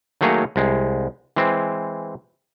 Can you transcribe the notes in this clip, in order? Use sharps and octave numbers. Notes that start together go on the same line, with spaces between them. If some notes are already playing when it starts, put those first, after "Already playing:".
D#3 F#3 A3 A#3 G#4 C#5
C2 G#3
E3 G#3 C4